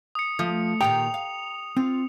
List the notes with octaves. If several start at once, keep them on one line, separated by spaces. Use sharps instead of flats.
D#6 C#7
F3 A3
A#2 D#3 G4 G5 A#5 D#6 F7
F5
C4 F4